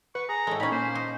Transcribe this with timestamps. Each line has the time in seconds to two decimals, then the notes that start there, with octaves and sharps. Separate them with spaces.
0.15 B4 F#5 C#6
0.29 G#4 G#5 A#5
0.47 A2 G#3 A4
0.60 A#2 C#4 D#4 B5
0.72 A#3 C5
0.95 D#4